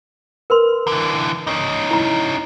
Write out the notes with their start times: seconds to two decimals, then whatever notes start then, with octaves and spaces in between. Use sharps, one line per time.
0.50 A#4 B4 C6
0.87 D3 E3
1.47 C#4 D#4
1.91 E4 A#5